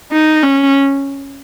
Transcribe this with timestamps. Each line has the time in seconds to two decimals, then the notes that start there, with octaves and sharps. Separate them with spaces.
0.12 D#4
0.43 C#4